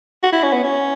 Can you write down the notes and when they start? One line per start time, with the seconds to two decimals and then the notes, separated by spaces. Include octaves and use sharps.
0.23 F#4
0.33 E4
0.43 C#4
0.53 B3
0.64 C#4